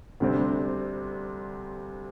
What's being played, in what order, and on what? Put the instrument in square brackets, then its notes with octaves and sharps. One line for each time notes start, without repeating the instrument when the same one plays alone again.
[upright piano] D2 C3 G3 C4